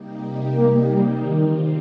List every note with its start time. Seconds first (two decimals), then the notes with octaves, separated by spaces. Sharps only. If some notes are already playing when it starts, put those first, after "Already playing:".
Already playing: C3 G3 A#3 D#4 G4
0.55 A#3
0.90 G3
1.24 D#3 G3 C4 F4